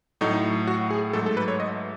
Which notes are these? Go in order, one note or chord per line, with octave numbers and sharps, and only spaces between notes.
A2 F#3 A3 D#4
F#4
G#4
G#2 F#3 A3 A4
A4
B4
C#5
D#5